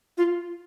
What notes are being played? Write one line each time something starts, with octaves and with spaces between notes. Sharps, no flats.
F4